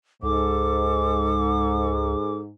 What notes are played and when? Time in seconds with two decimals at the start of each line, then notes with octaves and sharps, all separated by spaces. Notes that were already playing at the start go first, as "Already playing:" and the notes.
0.23 C#2 G#2 A4 D6